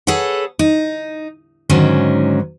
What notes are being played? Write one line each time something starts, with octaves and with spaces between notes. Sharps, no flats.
G#4 A4 B4 C#5 F#5
D#4
G#2 D3 D#3 F#3 C#4